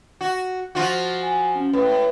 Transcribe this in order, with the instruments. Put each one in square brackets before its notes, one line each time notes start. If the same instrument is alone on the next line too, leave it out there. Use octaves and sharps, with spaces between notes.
[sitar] F#4
F3 F4 F#4
[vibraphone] G#5
C#4
[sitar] A2 [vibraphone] B4